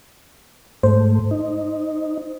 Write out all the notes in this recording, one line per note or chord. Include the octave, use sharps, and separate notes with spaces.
G#2 A3 C5
D#4